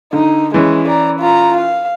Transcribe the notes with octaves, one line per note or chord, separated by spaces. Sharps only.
D3 D#4
E3 G#3 C#4
D5 A#5
F4 A#5
F5